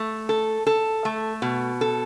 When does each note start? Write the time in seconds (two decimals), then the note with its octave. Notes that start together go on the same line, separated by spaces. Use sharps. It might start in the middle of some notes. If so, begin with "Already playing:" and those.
Already playing: A3
0.29 A4
0.67 A4
1.05 A3
1.42 B2
1.81 A4